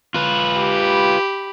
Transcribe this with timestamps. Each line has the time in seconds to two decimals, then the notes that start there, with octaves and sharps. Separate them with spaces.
0.14 F4 B4
0.59 G4 B5